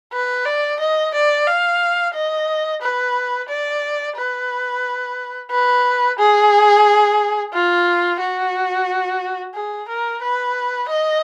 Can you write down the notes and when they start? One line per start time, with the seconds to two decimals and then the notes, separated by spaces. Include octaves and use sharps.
0.13 B4
0.46 D5
0.80 D#5
1.14 D5
1.47 F5
2.14 D#5
2.82 B4
3.49 D5
4.16 B4
5.51 B4
6.19 G#4
7.53 F4
8.19 F#4
9.54 G#4
9.88 A#4
10.22 B4
10.88 D#5